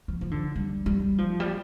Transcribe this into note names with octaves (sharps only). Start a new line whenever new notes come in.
F3
F3
D3
G3
G3
F3
G3